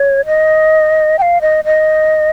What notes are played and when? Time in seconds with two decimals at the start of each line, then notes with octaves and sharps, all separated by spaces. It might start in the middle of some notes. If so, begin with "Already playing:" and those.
Already playing: C#5
0.26 D#5
1.18 G5
1.22 F5
1.41 D#5
1.65 D#5